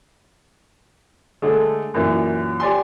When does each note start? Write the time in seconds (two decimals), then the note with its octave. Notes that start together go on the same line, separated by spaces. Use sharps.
1.42 D3 G#3 A3
1.94 F#2 A#2 E3
2.60 G4 D5 G#5 C6